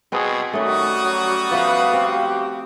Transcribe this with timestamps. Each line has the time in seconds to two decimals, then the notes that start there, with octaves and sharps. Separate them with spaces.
0.12 B2 C4 G#4 B4
0.53 D#3 G3 A3 C#4 F#4 D#6
1.04 F#3
1.51 F3 A3 B3 B4 F5
1.93 C4 G4